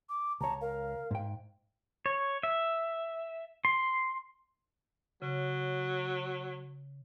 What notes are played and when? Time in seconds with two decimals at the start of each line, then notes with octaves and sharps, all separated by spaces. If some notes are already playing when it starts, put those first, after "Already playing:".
0.09 D6
0.41 C#2 C#5 A5 A#5
0.61 A#4 F5
1.11 G#2 G5
2.06 C#5
2.43 E5
3.65 C6
5.22 C#3 F#3